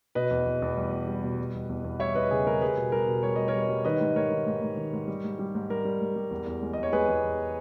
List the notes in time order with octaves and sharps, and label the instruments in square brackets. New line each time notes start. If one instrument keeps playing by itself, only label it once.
[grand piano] B2 B4 D#5
E2
E2
E2
G3
G3
G3
B2
G3
E2
E2
E2
G3 C#5 E5
E2 B4 D#5
C#3 G#4
G3 A#4
G3 G#4 B4
B2
G3 A#4
B2
G3 C#5
G3 D#5
A#4 C#5
G3
G3
D#3 B4 D#5
G#2
G#2 A#4 C#5
D#3
G#2
G#2
D#3
G#2
G3
G#2
G3
G#2
G3 A#4
G3
G#2
G3
E2
E2
G#3
E2 D#5
C#5
G#3 G#4 B4
E2
E2